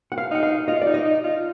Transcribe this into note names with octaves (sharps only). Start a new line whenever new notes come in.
F#5
F5
D#4 F#5
F5
F4 D#5
D5
D#4
D#5
D#4
F4